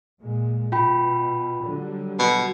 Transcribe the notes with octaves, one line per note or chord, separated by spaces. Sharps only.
A#2 G#3
B2 F4 G5 B5
D3 F#3 G3
B2 F#4